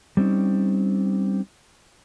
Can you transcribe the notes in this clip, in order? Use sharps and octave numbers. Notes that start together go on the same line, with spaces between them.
G3 C4 C#4 D#4